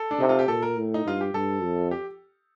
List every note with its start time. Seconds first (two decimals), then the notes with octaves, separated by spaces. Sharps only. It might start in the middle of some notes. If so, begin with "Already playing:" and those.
Already playing: A4
0.11 D4
0.20 C3 D#4
0.29 F4
0.39 G4
0.48 A#2 A4
0.62 A#4
0.77 A2
0.94 D#4
1.06 G2 F4
1.21 G4
1.34 G2 A4
1.63 F2
1.91 G4